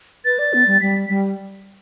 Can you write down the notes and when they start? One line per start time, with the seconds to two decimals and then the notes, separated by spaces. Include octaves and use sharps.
0.25 B4 A6
0.39 D5
0.54 B3
0.67 G3
0.81 G3 B6
1.09 G3